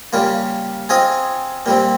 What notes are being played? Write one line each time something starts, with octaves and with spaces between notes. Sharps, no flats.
C#3 G3 A#3 F4
C4 F4 G#4 D#5
A#2 G3 C4